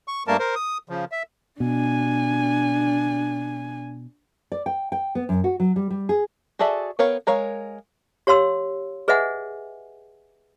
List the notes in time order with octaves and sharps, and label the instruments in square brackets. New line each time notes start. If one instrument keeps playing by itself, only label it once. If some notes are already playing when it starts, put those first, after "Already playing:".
[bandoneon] C#6
G2 G3 A3 A#3 A#4 A5
A#4 C5
D#6
C#3 F3
E5
[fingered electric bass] B2 [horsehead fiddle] D4 G#5
[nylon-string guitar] D5
G5
G5
B3
F#2
F#4
F#3
G3
G3
G#4
[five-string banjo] F#4 G#4 A4 D5 E5
B3 A#4 C#5 F5 G5
G#3 A#4 C#5 F5
[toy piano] G4 C#5 F5 C6 E6
G#4 B4 D#5 E5 F#5 G#5